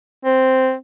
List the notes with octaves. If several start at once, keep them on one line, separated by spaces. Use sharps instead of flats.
C4